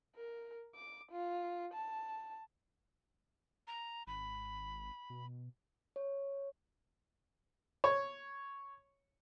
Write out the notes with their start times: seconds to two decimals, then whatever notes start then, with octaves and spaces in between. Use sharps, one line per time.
0.16 A#4
0.75 D6
1.12 F4
1.74 A5
3.67 A#5
4.07 G#1 B5
5.10 B2
5.96 C#5
7.84 C#5